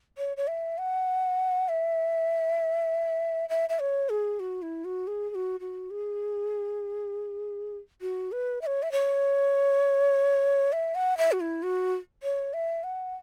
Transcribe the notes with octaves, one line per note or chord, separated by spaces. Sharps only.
C#5
C#5
E5
F#5
E5
E5
E5
C#5
G#4
F#4
E4
F#4
G#4
G#4
F#4
F#4
G#4
F#4
B4
E5
C#5
E5
C#5
E5
F#5
E5
F#4
E4
F#4
C#5
E5
F#5